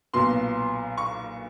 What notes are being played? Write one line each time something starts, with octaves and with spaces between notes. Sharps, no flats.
B1 A#2 F#3 B3 C6
C#6